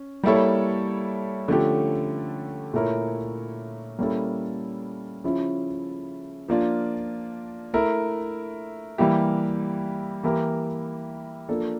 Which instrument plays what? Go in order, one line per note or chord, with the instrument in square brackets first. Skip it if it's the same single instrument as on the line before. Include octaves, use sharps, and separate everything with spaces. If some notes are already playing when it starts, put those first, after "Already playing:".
Already playing: [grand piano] C#4
G3 A#3 E4 A4 C#5
D3 F3 A3 C#4 G4
A#2 A3 E4 A#4 C#5
G3 A#3 C#4 E4 A4
C#3 F3 C#4 E4
F3 A#3 D4 F4
A3 E4 A#4
E3 G3 A#3 E4 G4
E3 A#3 E4 G4 A#4
F3 A#3 D4 A4